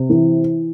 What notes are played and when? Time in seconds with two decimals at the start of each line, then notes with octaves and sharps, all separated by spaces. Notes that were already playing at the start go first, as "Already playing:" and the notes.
Already playing: C3
0.09 E3